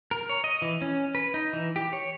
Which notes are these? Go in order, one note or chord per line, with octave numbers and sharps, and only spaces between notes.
A#4
C#5
D#5
E3
C#4
B4
D#4
E3
G4
C#5